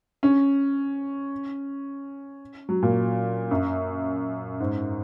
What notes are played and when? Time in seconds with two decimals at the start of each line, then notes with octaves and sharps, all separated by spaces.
0.23 C#4
2.69 F#3
2.83 A#2
3.51 F#2
4.60 G#2